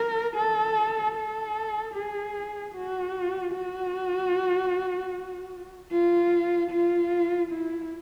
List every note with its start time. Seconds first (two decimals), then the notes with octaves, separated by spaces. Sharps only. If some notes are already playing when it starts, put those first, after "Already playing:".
Already playing: A#4
0.36 A4
1.15 A4
1.94 G#4
2.75 F#4
3.53 F#4
5.91 F4
6.70 F4
7.51 E4